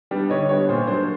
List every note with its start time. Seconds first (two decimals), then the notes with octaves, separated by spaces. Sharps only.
0.11 G3 B3 D4
0.30 D3 C#5 D#5
0.49 G3 B3 D4 C#5
0.68 A#2 C5
0.87 F#3 A#3 D4 C5